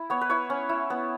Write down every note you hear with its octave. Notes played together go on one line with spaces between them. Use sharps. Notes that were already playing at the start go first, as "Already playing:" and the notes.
Already playing: E4
B3 C#5
B4
E4 C#5
C#4
E4
B3